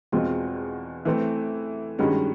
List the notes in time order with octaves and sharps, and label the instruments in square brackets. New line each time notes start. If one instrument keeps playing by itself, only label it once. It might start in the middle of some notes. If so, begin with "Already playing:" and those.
[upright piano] E2 B2 G#3 C4 F4
E3 A3 C4
G2 D#3 G#3 C#4 F#4